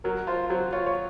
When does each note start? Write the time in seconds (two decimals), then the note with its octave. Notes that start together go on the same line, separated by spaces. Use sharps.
0.04 F#3 A#4
0.27 F4 C5
0.50 F#3 C5
0.73 F4 C#5
0.86 C#5